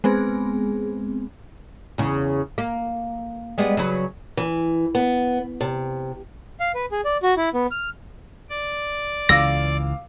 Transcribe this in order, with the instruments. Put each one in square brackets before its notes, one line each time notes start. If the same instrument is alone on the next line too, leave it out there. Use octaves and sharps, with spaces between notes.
[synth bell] G#3 B3 C4 G#4
[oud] E2 C#3
A#3
G3 G#3 B3
C#3 F#3 B4
[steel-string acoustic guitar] E3
B3
C3
[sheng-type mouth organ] F5
B4
G#4
D5
F#4
E4
B3
F6
[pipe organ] D5
[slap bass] C#2 C#3 E3 [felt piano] F5 D6 E6 [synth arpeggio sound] A#6